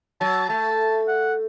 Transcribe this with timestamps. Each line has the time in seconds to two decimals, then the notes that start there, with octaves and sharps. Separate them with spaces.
0.21 F#3 A5
0.49 A3 A5
1.08 F#5